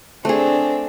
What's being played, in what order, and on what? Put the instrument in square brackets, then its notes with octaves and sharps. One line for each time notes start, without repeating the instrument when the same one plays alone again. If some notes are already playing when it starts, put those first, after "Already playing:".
[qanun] A3 G#4 [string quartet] C4 D4